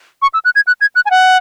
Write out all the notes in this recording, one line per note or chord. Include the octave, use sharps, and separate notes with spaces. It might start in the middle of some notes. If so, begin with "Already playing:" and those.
C#6
E6
F#6
G#6
F#6
G#6
F#6
G#5
F#5